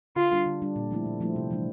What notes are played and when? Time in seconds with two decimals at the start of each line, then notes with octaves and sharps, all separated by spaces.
0.16 D3 F4
0.32 G3 D4
0.46 D3
0.62 G3 D4
0.76 A#2
0.91 F3 A3 C4 E4
1.06 A#2
1.21 F3 A3 C4 E4
1.36 C3
1.51 E3 G3 D4